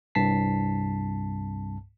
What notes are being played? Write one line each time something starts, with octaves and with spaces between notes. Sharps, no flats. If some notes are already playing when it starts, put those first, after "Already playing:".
C2 G2 A5 B6 C7